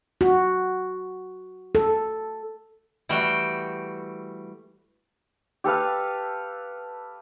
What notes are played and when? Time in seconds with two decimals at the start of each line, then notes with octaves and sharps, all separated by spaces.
0.21 F#4
1.75 A4
3.09 E3 G3 A3 F#4 G5
5.64 G4 A4 B4 F5